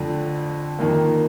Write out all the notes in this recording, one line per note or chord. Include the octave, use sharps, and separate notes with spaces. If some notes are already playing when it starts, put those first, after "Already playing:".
Already playing: F2 D3 A3
F2 D#3 A#3